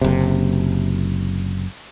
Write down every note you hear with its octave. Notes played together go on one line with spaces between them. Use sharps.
F#1 C3